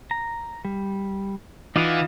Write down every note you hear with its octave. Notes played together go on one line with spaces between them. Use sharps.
A#5
G3
E3 D#4 F4 D5 F5 F#5